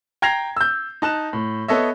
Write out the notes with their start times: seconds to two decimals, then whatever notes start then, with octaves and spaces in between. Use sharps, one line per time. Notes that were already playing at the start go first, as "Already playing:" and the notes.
0.22 G5 A#5 G#6 A#6 C7 F7
0.57 E6 G6
1.02 D#4 A5 F#6 E7
1.33 A2
1.68 B3 A4 C#5 D#5 E5